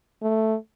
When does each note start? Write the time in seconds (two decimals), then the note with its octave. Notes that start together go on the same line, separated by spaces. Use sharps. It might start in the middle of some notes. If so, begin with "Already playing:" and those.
0.23 A3